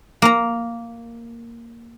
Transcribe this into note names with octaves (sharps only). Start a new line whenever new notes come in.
A#3 A#5